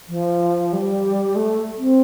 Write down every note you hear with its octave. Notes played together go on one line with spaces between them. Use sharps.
F3
G3
A3
C4